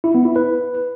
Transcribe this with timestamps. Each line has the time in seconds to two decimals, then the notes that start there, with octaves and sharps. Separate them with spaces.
0.04 E4
0.15 B3
0.25 E4
0.36 B4